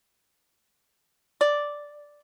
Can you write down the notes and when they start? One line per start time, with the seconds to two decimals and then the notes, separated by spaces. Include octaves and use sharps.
1.41 D5